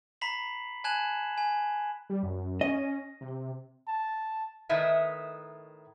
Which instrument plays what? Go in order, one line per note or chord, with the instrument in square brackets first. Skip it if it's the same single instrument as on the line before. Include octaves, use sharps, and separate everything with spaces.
[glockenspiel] A#5 B5 B6 C7 F#7
G#5 A5 F#6 G#6 E7 F#7
G#5
[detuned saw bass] G3
F#2
[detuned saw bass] C#4 [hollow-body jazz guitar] D#5
[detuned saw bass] C3
[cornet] A5
[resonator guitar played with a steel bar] A2 D#3 B4 D#5 E5